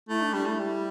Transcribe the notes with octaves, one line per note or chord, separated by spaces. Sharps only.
A3 E4
D4
G3 D4
A3 E4
G3 E4